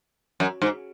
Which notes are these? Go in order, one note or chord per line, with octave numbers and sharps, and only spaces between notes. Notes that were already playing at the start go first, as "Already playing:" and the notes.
F#2
G#2